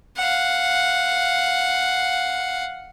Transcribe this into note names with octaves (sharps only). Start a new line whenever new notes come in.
F5 F#5